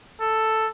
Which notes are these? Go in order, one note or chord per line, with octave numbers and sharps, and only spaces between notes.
A4